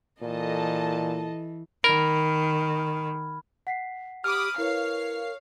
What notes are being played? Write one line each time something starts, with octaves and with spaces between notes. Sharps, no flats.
A#2 E3 A4 D#5 A5
D#3 A#4 B5 F6 G#6
F#5 B6 C7
G4 B5 D6 D#6 F6
E4 A#4 B4 C#5 F5 C7